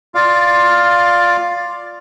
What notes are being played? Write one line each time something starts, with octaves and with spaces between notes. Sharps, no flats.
F4 D5 F5